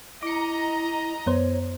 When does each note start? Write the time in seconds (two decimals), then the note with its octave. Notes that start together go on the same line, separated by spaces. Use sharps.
0.23 E4 D#5 A#5 D6 C#7
1.26 F#2 B3 C5 C#5